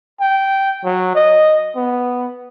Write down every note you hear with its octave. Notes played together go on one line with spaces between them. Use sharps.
G5
F#3
D#5
B3